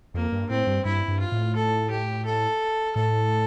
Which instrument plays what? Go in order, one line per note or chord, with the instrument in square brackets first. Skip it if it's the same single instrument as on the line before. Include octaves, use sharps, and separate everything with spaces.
[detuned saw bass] F2 [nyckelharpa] A#3
[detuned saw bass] G2
[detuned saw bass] A2 [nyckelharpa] C4
[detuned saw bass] G2
[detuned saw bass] G2 [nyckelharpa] E4
[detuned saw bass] G2
[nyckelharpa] F4
[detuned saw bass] A2
[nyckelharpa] A4
G4
A4
[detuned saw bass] A2 [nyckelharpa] A4